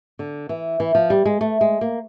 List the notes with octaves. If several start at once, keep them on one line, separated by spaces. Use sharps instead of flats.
D3
E3
E3
F3
G3
G#3
A3
G#3
A#3